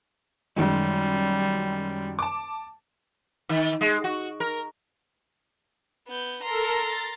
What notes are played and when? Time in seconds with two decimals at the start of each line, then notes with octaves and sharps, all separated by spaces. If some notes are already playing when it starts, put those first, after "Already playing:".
0.56 F#2 D#3 G3 G#3
2.19 A5 D6
3.49 D#3
3.81 G#3
4.04 F#4
4.40 A#4
6.08 B3 G6
6.43 A4 A#4 A#5 C6
6.78 A6